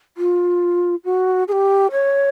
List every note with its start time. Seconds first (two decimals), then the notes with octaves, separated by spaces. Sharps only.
0.17 F4
1.05 F#4
1.48 G#4
1.52 G4
1.92 C#5